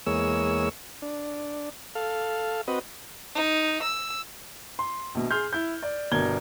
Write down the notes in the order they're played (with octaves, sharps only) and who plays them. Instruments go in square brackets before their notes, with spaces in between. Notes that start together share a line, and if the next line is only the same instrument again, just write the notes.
[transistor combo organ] E2 G#3 A#3 C#5 E6
D4
A4 F5
C4 F#4 B4 D#5
[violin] D#4
E6
[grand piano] C6
A#1 B2
G#4 C6 F6 G6
E4 G6
D5
G1 B2 D4 A#4 G#6 G7